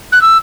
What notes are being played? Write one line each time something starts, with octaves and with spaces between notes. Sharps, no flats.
F#6
E6